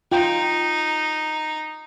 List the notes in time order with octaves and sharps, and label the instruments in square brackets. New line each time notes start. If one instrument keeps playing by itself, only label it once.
[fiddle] D#4 [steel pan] F4 G5